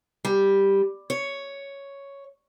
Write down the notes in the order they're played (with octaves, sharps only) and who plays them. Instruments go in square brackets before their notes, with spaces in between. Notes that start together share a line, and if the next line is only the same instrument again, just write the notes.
[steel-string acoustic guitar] G3
C#5